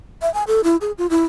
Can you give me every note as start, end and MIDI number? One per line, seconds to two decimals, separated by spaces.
0.22 0.32 76
0.34 0.43 80
0.47 0.61 69
0.64 0.77 64
0.81 0.92 68
0.98 1.07 65
1.10 1.24 64